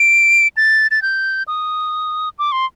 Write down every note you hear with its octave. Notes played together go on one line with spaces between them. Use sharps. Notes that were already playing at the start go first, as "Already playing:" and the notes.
Already playing: D7
A6
A6
G6
D#6
D6
C6